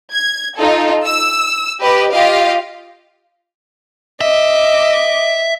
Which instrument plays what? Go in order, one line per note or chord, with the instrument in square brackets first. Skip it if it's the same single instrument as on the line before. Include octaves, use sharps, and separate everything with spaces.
[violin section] G#6
D#4 F4 A4
E6
G4 B4 D#5
F4 G4 D#5 F5
[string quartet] D#5 D6 [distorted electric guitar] E5